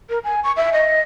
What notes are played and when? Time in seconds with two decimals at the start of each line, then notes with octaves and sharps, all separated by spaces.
0.10 A#4
0.24 G#5
0.44 C#6
0.57 E5
0.73 D#5